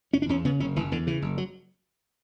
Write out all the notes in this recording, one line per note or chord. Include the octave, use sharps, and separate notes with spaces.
F#1 C#4
D4
E2 C#4
C#3 B3
F#1 C#4
F#1 E3
E2 D3
C#3 E3
F#1
F#3